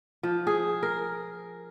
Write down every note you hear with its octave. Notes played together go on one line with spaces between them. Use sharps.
F3
G#4
A#4